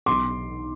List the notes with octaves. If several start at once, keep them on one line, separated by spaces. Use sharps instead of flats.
B1 B2 F#3 B3 D#4 C6 D6